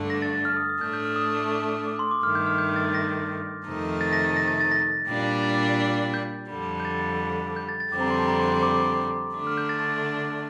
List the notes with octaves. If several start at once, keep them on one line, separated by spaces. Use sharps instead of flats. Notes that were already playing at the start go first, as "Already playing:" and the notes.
Already playing: G2 D3 A3 D4
A#6
A6
A6
F6
D#6
D#6
A2 A3 D4 G6
G6
F6
D#6
D6
C6
D6
G2 D#3 A3 F6
G6
F6
G6
A6
A#6
F2 C3 D#3 A3 D#4
A6
A#6
A6
A#6
A6
A6
A#6
A#2 G3 D4
A6
G6
F2 D3 G3
G6
A6
G6
A6
A6
F2 D3 G3 C4 D6
A#5
C6
A5
A#5
C6
C6
D6
D3 A3 D4 D6
F6
G6
A6